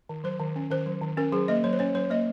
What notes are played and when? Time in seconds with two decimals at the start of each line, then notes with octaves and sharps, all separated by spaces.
0.09 D#3
0.24 F#3 C5
0.39 D#3
0.56 C#4
0.71 D#3 C5
0.86 F#3
1.02 D#3
1.17 C#4 A#4
1.32 F#3 G#4
1.48 A#3 D#5
1.64 F#3 C#5
1.73 C5
1.79 C#4 C#5
1.95 F#3 C#5
2.10 A#3 D#5